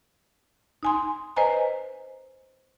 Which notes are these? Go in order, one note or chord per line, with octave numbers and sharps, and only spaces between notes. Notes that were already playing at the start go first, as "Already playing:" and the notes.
D#4 G#5 C6
B4 C5 D#5 G#5 A#5